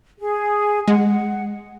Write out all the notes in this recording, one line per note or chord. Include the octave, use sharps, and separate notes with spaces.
G#4
G#3 F#5